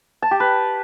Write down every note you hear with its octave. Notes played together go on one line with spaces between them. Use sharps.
A5
G4
B4